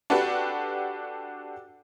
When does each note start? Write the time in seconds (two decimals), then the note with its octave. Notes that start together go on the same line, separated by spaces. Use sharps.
0.10 D4 F#4 G4 A4 B4